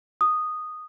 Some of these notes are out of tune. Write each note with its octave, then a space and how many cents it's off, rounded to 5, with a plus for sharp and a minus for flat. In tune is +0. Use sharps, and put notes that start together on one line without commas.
D#6 -10